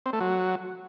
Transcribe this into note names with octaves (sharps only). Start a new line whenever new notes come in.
C4
A3
F#3